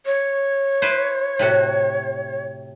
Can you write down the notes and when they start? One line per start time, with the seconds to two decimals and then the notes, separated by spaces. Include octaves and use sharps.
0.06 C#5
0.82 E4 B4 C5
1.39 A2 C3 F#4